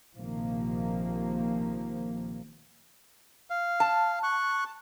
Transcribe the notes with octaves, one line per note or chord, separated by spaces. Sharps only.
A#1 C3 D#3 F3 A#3
F5
A5
C#6 F#6